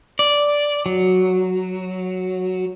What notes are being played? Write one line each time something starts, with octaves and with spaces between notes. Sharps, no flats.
D5
F#3